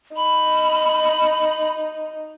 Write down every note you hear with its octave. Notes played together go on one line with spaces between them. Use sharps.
D#4 B5